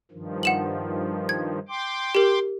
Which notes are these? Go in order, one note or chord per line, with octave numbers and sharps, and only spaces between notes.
G2 D#3 F3
F#5 E7 F#7
G#6
G5 C6 D6
G4 A#4